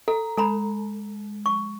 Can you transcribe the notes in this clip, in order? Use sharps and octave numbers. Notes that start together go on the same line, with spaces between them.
A4 A#5
G#3 A4 A#5 B5
C#6